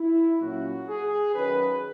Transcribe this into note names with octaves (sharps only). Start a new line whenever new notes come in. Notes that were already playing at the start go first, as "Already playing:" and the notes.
Already playing: E4
A#2 F#3 C#4 F#4
G#4
F#2 D#3 F#3 C#4 B4